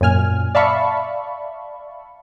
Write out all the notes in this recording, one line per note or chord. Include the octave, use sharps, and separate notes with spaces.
F#2 A#2 G#5 F6
D5 E5 F5 A5 B5 C#6